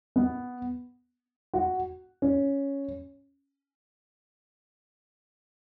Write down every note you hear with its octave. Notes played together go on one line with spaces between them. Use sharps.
B3
F#4
C#4